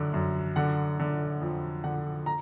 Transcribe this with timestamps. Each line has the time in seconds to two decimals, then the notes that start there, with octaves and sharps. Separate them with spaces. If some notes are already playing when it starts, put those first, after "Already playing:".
Already playing: F#2 D3
0.14 F#2
0.56 D3 F#5
0.99 D3
1.41 F2
1.84 D3 F#5
2.26 A#5